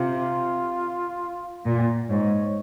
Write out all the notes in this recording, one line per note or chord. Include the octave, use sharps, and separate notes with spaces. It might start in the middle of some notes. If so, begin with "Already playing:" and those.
Already playing: C3 F4
A#2
G#2 C#5